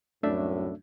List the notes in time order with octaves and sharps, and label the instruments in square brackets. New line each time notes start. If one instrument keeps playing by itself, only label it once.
[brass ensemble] C2 F#2 A2 [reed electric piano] A3 D4 E5